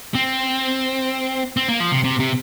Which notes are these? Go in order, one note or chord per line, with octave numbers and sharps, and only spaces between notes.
C4
C4
A#3
F3
C3
C3
C3